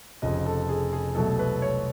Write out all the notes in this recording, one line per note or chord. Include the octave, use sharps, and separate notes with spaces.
F1 F2 C#3 D#5
A4
G#4
G#4
C2 B2 F#3 A3 A4
B4
C#5